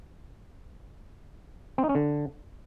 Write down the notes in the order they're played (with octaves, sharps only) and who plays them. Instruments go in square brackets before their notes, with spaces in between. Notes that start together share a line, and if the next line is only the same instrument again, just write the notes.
[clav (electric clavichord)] C4
D#4
C#4
D3